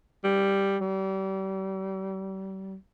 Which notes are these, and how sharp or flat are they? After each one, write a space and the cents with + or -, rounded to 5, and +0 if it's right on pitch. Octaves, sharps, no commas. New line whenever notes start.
G3 +5
G3 -35